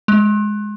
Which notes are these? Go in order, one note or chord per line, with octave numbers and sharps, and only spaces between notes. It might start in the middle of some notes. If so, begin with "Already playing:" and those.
G#3